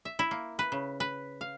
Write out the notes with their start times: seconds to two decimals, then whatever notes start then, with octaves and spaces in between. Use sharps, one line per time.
0.05 E5
0.19 E4
0.31 A#3
0.59 B4
0.72 C#3
1.00 B4
1.41 F5